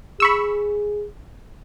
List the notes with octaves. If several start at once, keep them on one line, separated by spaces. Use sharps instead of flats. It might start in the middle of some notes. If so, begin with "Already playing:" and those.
G#4 B5 C#6 E6